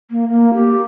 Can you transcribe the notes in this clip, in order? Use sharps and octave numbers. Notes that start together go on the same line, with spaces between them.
A#3
A#3
G4